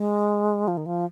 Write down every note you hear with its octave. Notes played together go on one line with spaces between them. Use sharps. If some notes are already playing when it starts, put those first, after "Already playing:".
Already playing: G#3
F3
D#3
F3